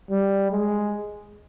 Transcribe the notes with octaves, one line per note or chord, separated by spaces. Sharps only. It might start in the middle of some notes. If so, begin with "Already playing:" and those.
G3
G#3